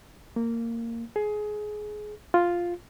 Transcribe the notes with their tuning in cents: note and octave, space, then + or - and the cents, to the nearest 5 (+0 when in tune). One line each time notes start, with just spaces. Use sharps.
A#3 -15
G#4 +20
F4 +0